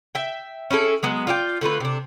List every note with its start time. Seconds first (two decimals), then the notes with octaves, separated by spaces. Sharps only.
0.15 E5 G5
0.71 C#4 E4 G#4 A4
1.03 F#3 G#3 B3
1.27 F4 D5 E5 G5
1.61 D3 A3 F4 B4
1.80 C3 D4